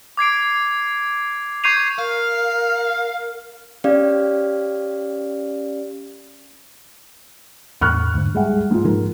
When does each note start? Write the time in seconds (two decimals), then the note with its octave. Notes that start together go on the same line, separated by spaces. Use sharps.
0.17 D6 G#6 C7 D7
1.64 C#6 G6 G#6 C7 D#7 F7
1.99 A#4 F5
3.84 C#4 G4 D5 F5
7.81 E2 A2 C#6 F6 F#6
8.14 D2 G#2
8.35 G3 G#3 E5 F#5
8.71 G#2 F4
8.85 G#2 F3 G#3 A#4